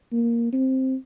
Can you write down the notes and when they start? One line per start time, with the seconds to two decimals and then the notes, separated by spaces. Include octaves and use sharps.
0.12 A#3
0.52 C4